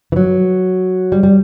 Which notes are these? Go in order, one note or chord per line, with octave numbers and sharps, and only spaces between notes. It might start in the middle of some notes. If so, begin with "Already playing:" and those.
E3
F#3
G3
G3